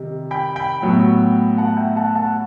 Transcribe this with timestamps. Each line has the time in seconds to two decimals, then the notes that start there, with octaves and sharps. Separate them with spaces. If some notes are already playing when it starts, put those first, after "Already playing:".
Already playing: C3 D#3 G3
0.31 G5 B5
0.56 G5 B5
0.82 A2 F#3 B3
1.58 F#5 A5
1.77 E5 G5
1.96 F#5 A5
2.15 F#5 A5